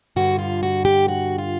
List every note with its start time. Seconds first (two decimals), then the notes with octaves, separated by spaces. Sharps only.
0.16 G2 D3 F#4
0.39 F4
0.63 F#4
0.85 G4
1.08 F#4
1.38 F4